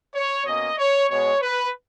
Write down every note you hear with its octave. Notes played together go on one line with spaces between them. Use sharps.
C#5
B2 A#3 C#4 D#5
C#5
B2 G#3 B3 C#5
B4